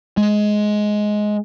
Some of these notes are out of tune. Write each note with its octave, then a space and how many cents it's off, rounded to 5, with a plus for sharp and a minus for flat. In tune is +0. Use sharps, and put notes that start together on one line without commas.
G#3 +15